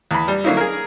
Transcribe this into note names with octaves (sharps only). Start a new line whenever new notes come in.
E2 B5
G3
D3 F#3 A#3 C#4 D#4 E4
G#4 A#4